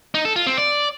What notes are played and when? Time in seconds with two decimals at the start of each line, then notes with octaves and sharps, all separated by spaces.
0.14 D#4
0.25 A4
0.36 F4
0.47 C4
0.57 D5